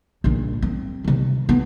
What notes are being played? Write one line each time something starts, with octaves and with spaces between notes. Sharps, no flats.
A#1 A#2
C4
C3 D#3
B3